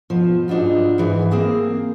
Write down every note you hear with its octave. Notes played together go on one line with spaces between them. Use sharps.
B2 F3
G#2 D4 D#4 F4 F#4
G#2 E3 G#4
A#3 C4 G#4 F5